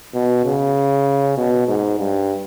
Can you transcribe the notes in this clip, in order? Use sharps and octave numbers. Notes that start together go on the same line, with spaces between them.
B2
C#3
B2
G#2
G2